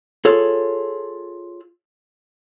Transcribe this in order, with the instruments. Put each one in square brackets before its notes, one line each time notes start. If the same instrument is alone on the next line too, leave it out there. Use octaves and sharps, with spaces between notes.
[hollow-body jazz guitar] F4 G#4 A4 C#5